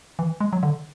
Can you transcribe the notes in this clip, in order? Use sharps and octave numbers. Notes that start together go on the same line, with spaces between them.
E3
G#3
F#3
D3